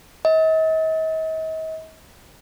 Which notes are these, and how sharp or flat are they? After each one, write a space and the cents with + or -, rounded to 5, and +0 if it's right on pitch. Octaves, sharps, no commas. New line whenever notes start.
D#5 +45